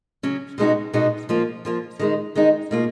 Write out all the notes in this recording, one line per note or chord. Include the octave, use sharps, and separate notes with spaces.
C#3 F#3 C#4
B2 G#3 B3 D#4 F#4
B2 G#3 B3 D#4 F#4
F3 A#3 F4
F3 A#3 F4
D#3 G#3 D#4
D#3 G#3 D#4
B2 A#3 F4